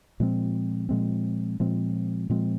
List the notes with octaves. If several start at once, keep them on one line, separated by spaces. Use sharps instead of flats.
A#2 F3 G#3 C4
A#2 F3 G#3 C4
A#2 F3 G#3 C4
A#2 F3 G#3 C4